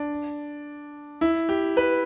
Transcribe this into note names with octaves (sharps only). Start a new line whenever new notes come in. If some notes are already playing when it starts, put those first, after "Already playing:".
Already playing: D4
E4
G4
B4